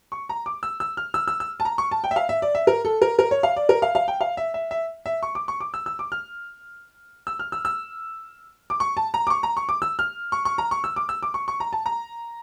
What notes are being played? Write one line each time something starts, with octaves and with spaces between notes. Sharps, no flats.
C#6
A#5
D6
E6
E6
F6
E6
E6
E6
A5
A#5
C#6
A5
G5
E5
F5
E5
D5
E5
A#4
A4
A#4
A#4
C#5
F5
D5
A#4
F5
F5
G5
F5
E5
E5
E5
E5
C#6
D6
C#6
D6
E6
E6
D6
F6
E6
F6
E6
E6
D6
C#6
A5
A#5
D6
C#6
A#5
C#6
D6
E6
F6
C#6
C#6
A#5
C#6
E6
D6
E6
D6
C#6
C#6
A#5
A5
A#5